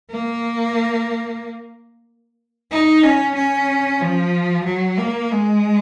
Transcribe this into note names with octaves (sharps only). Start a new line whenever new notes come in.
A#3
D#4
C#4
C#4
F3
F#3
A#3
G#3